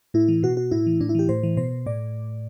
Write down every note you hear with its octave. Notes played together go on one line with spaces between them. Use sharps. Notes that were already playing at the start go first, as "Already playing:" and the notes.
A2 E4
E3
B2 F#4
F#4
A2 E4
E3
A2 D4
E4
E3 G4
A2 C5
E3
B2 C5
A2 D5